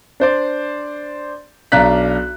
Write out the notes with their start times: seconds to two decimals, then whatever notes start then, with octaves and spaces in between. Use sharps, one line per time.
0.20 D4 C5 D5
1.72 B1 D4 F5 A#5 F#6 B6